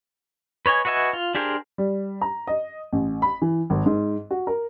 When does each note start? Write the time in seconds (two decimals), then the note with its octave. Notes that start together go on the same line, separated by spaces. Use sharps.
0.66 B4 C#5 D#5 G#5
0.85 F#4 B4 D#5 E5 G#5
1.13 F4
1.35 D4 G4 G#4 A#4 C5
1.78 G3
2.21 A#5
2.47 D#5
2.93 A1
3.22 B5
3.42 E3
3.70 G#1
3.86 G#2
4.31 F#4
4.47 A#4